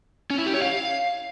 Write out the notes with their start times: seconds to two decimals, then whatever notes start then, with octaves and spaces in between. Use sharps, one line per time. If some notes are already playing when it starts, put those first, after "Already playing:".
0.30 C#4
0.38 E4
0.46 G4
0.54 C#5
0.62 F5